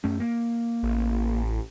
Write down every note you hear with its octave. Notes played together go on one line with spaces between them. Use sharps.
F#2 A3 C#4
A#3
A1